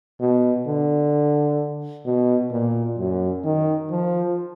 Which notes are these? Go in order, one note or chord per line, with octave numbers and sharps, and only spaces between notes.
B2
D3
B2
A#2
F#2
D#3
F3